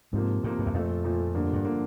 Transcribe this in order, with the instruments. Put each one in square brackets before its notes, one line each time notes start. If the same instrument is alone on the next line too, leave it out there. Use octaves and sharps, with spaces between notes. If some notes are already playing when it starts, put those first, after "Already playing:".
[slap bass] G#2 [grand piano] C3 F3 A#3
[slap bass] G#2 [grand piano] C3 F3 A#3
[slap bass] G2
E2
[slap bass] F2 [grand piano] A#2 F3 A3
[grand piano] A#2 F3 A3
G2 D3 F3 A#3
[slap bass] G2
[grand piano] D3 F3 A#3